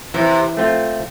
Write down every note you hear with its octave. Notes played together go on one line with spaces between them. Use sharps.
C3 E3
A3 C4 F4